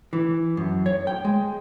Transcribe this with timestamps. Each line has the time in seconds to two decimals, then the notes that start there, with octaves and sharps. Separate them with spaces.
0.13 E3
0.57 F#2
0.86 C#5
1.07 G5
1.25 G#3